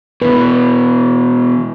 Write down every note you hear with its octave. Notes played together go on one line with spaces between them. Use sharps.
B2 E3 B4